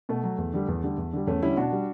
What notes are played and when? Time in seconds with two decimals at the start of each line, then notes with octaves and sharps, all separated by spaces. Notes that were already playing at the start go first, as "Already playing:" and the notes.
0.09 B2 A3
0.23 F#3
0.38 E2
0.53 D3 G3
0.68 E2
0.84 D3 G3
0.97 E2
1.13 D3 G3
1.27 E2 A3 C#4
1.42 D3 G3 C#4 E4
1.57 B2 D4 F#4
1.72 G3